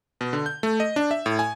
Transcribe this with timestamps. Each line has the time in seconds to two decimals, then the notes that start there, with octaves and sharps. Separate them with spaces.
0.21 B2
0.33 D3
0.46 G6
0.63 A3
0.80 D#5
0.96 D4
1.11 E5
1.26 A2
1.39 G#5